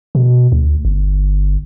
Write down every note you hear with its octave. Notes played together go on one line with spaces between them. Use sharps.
B2
D2
G1